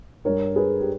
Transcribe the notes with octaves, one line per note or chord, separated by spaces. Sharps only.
G2 G3 A#4 C#5
G#4 B4
G4